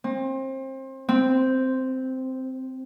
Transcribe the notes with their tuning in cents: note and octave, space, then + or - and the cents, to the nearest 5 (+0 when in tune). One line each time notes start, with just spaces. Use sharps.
C4 +30
C4 -5